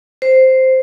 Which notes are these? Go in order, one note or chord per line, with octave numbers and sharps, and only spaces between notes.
C5